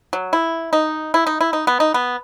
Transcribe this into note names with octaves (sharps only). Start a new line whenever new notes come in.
F#3
E4
D#4
E4
D#4
E4
D#4
B3
D#4
B3